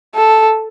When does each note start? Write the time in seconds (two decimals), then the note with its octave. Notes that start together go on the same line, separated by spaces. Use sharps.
0.15 A4